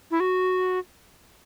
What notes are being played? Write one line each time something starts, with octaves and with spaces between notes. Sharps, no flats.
E4
F#4